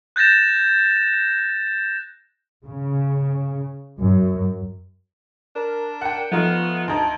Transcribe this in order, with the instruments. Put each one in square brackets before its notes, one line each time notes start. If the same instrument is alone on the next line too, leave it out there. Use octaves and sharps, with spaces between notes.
[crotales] F#6 G6 A6 A#6 E7
[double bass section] C#3
F#2
[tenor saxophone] D4 [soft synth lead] A#4
[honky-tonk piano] F#5 G5
[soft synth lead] F3 [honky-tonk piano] A3 D#4 F4 [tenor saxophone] B3
[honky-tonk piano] D2 D#4 [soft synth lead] A5